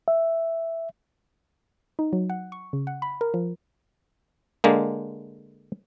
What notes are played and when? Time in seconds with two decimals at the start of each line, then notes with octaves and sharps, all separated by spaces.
0.08 E5
1.99 D#4
2.13 F#3
2.30 F#5
2.52 C#6
2.73 C#3
2.87 F#5
3.02 B5
3.21 A#4
3.34 F3
4.64 D3 G#3 A#3